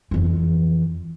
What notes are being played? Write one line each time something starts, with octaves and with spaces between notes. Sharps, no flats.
F2 E3